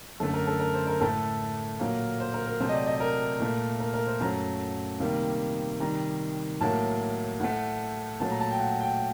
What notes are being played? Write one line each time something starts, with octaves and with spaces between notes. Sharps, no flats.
F#2 D3 A3 A4
A#4
A4
A#4
C5
A#4
A2 A3 A4
A#2 F#3 A#3 A#4
C5
A#4
A#4
C3 F#3 A3 C5
D#5
D5
D#5
A#4
A#2 A3
A#4
A#4
C5
F#2 F#3 A3 A#5
C3 D#3 G3 A#3
C3 D#3 G3 A#5
A2 F#3 A#3 A5
A2 A3 F#5
A#2 F#3 A3 A5
A#5
A5
G5
F#5
G5